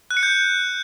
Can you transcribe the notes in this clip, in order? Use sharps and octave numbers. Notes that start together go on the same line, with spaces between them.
F#6
C#7
G6